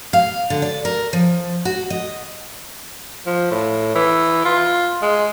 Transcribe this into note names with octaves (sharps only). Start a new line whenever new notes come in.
F5
D3
D5
A#4
F3
F#4
D#5
F3
A2
E3
F4
G#3